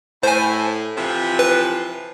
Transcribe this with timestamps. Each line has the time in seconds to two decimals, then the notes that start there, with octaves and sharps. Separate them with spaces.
0.23 A2 C5 G#5
0.97 C3 E3 F3
1.39 B4